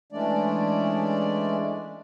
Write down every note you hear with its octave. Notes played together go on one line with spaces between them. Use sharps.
E3 G#3 A3 C#4 D4 D5